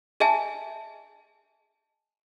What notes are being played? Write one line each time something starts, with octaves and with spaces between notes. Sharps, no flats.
G#4 D#5 E5 G#5 A5